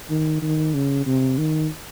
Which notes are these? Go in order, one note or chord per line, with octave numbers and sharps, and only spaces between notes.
D#3
D#3
C#3
C3
D#3